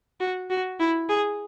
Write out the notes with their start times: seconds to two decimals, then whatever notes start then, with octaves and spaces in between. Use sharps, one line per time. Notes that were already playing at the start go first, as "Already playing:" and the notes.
0.20 F#4
0.50 F#4
0.80 E4
1.09 G#4